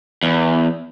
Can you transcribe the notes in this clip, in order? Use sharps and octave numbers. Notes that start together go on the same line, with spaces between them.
E2